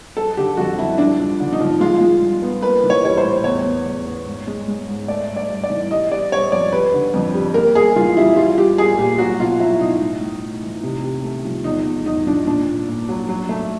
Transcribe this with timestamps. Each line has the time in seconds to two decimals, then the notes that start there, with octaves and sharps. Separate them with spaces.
0.17 F#3 A4
0.37 D3 G4
0.57 F2 F#4
0.78 F2 E4
0.98 G2 D4
1.19 F3
1.40 D3
1.53 D#4
1.60 F3
1.80 G#3 F4
2.01 G#3
2.21 G2
2.42 B3
2.62 A#3 B4
2.84 E3
2.90 C#5
3.04 G3 C#5
3.17 C5
3.24 A2
3.44 E2 C#5
3.65 B3
3.86 E2
4.06 B3
4.26 G#2
4.47 G#3
4.68 G#3
4.88 G#2
5.08 A3 D5
5.29 G2
5.36 D5
5.49 G2
5.64 D5
5.70 E3
5.91 G3 D#5
6.12 G3 D5
6.32 G3 C#5
6.52 F2 D5
6.72 G3 B4
6.94 D3
7.14 F2
7.34 G3
7.54 A#3 A#4
7.75 G2 G#4
7.96 E3 F4
8.17 G3 E4
8.36 G3 F4
8.58 G3 G4
8.77 G3 G#4
8.98 A#2 G4
9.18 F#3 F#4
9.40 B2 F4
9.59 F#3 E4
9.80 B2 D#4
10.00 A2
10.21 A2
10.42 A2
10.63 E3
10.83 C3
11.04 C3
11.24 A3
11.45 F3
11.64 E2 D#4
11.85 E2
12.06 E2 D#4
12.26 F3 D4
12.47 A#2 D4
12.68 A#2
12.88 A#2
13.09 F#3
13.29 F#3
13.49 A3